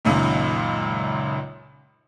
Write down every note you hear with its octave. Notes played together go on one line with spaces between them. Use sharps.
C#2 F#2 A#2 D#3